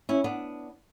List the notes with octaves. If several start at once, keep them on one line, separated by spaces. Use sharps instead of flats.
C#4 E4
B3 D4